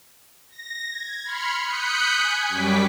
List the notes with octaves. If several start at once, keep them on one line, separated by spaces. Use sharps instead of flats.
A#6
G#6
B5 C6 F6 C#7
D#6 F#6 G6 B6 C#7
G#5
F#2 G3 C#6 D6 B6